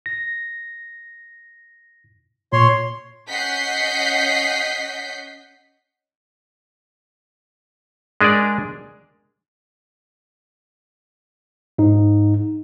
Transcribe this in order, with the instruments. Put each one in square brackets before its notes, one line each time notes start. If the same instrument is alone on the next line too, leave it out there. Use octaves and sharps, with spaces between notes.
[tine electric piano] A#6
[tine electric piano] A#2 [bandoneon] C#5 C6
[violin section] C#4 D#5 F#5 G6 B6 C7
[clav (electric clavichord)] G#3 D4 G#4 A#4 D5
[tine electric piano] G#2 D#4